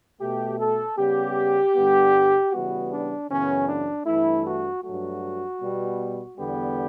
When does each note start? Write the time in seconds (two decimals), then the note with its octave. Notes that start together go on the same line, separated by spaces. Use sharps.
0.21 B2 A3 G4
0.59 A4
0.98 C#3 G3 B3 G4
1.75 G2 D3 G3 B3
2.52 C#3 E3 G3 B3 F#4
2.90 D4
3.29 F#2 C#3 E3 B3 C#4
3.68 D4
4.06 G2 E3 A3 E4
4.46 F#4
4.83 G2 F#3 A3 F#4
5.61 B2 G3 B3
6.38 E2 D3 G3 B3 G4